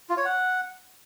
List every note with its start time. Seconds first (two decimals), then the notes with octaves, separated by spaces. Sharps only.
0.09 F4
0.17 C#5
0.25 F#5